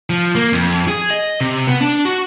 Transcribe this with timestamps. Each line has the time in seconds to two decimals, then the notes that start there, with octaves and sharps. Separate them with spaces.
0.10 F3
0.35 A#3
0.53 F2
0.88 G#4
1.10 D#5
1.41 C3
1.67 B3
1.81 D4
2.05 F#4